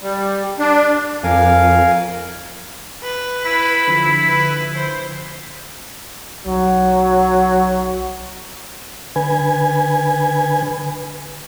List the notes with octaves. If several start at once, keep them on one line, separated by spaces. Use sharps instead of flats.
G3
D4
F2 A#4 F5 G#5
B4
E4 B5
D3 F3
B4
C5
B1 F#3
D3 B4 G#5